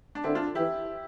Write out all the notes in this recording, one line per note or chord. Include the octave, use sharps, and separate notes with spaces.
D4
D3 C4 E4
D4 F4
E3 E4 G4